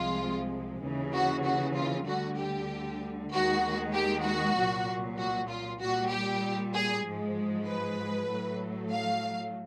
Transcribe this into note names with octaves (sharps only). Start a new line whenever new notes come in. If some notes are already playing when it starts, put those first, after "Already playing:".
Already playing: C2 C3 F3 G#3 F4
D#2 C#3 E3
F#4
F#4
F4
D2 D3 G3 F#4
G4
D#2 D#3 G#3 F#4
G4
F#4
C2 A#2 F#3
F#4
F4
A#2 G3 F#4
G4
G#4
G#2 F3 G#3
B4
A2 F#3 A3
F5